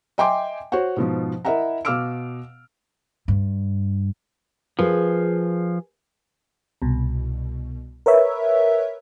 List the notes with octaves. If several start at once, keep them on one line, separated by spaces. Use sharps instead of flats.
D#5 E5 G5 G#5 C6 D6
F#4 C5 C#5 F#5
G#2 B2 F3
E4 A#4 D#5 E5 F#5 A#5
B2 F5 D6 E6 F6 D7
G2
F3 G#4 A#4 B4
C2 B2
A#4 B4 C#5 E5